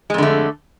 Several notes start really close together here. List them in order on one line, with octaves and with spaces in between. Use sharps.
G#3 F2 D3 A3